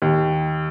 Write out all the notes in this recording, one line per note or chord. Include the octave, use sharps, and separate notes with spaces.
D#2